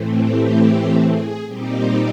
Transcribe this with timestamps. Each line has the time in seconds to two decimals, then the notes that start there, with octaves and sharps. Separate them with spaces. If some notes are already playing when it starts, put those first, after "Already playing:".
Already playing: A2 E3 A3 C4
0.19 G4
1.04 G#4
1.47 A#2 G3 C4 D#4 G4